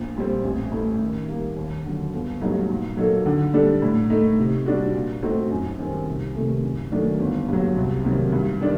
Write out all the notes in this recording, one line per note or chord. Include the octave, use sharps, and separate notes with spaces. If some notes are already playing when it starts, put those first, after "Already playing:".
Already playing: A#1
A#2 G3 C4
A1
A2 A3 D#4
D#3
G3 A#3
D#2
D3 F#3
G1
G2 F#3 A3 D#4
A#2
F#3 A#3 D#4 A4
D3
G3 D4 A4
A2
A3 D#4
C3
G3 D4 F#4
A#2
A3 C4 D#4 F#4
F#2
D#3 G3 C4
C2
C3 D#3 A3
F#2
D#3 F#3 A3 D4
G1
G2 F#3
C2
C3 D#3 F#3
G2
D#3 G3 D4